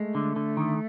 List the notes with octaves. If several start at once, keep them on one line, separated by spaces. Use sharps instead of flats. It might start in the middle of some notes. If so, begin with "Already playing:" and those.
Already playing: G#3 A3
D3
D3
D#3